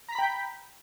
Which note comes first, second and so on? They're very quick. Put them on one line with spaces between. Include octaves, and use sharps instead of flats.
A#5 B6 B5 G5 G6